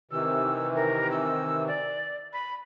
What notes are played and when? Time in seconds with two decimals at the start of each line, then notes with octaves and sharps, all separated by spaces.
0.11 C3 D#3 E3 E6
0.76 A#4
1.11 E6
1.67 D5
2.33 B5